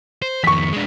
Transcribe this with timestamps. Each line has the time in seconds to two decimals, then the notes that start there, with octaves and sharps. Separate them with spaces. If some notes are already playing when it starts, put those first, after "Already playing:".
0.22 C5
0.44 F2 D#3 C#6 B6
0.73 G#3 D4